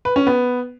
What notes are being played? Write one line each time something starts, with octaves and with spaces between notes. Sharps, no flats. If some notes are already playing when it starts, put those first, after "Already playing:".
B4
C#4
B3